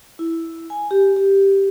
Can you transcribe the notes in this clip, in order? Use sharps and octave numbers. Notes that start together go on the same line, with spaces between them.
E4
G#5
G4
G4